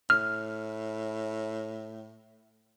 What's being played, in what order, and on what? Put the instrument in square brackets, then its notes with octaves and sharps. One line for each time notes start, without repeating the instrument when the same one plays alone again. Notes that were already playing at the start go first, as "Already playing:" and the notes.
[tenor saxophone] A2 [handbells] F6